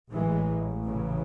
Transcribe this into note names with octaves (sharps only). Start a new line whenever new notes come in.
A1 A2 E3 G#3
C#3 E3